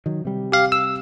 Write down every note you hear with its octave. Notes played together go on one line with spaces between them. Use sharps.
D#3 F#3
C3 G3
G4 F5
E6